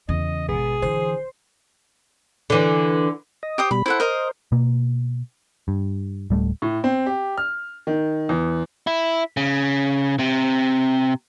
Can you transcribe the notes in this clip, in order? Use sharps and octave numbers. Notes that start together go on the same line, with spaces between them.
E2 C#3 D#5
G#1 B2 G#4
D3 E3 C5
D3 E3
D#5
G4 C5 D#6
B2 G3 B5
E4 A4 C5 F#5
A#4 D#5
B2 A#3
G2
D1 G3 A3
A2
C4
G4
F6
D#3
E2
E4
C#3
C3